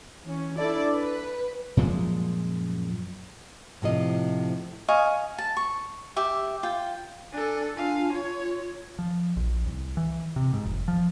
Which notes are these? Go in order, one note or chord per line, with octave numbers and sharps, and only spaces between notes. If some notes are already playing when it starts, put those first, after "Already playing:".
E3 C#4
D4 E4 A4 D5
B4
F#2 A#2 F3 G#3
A2 C3 F3 D#5
D#5 F5 G#5 C#6
A5
C#6
G4 E5
F4 G5
D4 A4 G#5
D4 F4 F5 G#5
F4 C#5
F3
A#1
C2
E3
C3
G#2
F1
F3